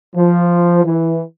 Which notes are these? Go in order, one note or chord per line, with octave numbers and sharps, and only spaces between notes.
F3
E3